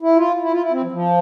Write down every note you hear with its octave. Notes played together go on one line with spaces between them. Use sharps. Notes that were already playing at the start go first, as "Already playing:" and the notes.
E4
F4
E4
F4
E4
C4
F3
F3